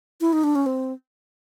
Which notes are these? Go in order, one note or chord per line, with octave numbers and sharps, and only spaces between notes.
E4
D#4
D4
C#4
C4